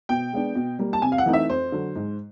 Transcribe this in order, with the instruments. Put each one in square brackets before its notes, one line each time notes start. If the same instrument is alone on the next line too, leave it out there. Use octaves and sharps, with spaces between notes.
[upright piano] B2 G5
G#3 B3 D4
B2
G3 A#3
A5
C3 G#5
F5
F#5
E3 A3 C4 D#4
E5
F2 C5
D3 F#3
G#2